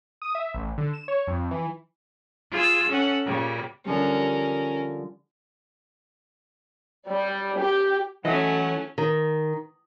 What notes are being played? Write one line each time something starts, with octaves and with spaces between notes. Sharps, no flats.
D#6
E5
A1
D3
E7
C#5
F2
E3
F4 G#4 E6
C#4 A4 F#5
A#2 C#3 G3
D3 F3 G3 C#4 A#4
G3
G4
E3 F#3 A3 C#4 D#5 E5 F#5
D#3